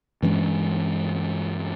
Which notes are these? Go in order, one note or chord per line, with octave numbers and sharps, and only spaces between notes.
G2 E3 G#3 C#4